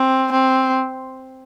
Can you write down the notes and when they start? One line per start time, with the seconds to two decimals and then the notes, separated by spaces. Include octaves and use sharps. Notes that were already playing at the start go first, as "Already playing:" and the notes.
Already playing: C4
0.32 C4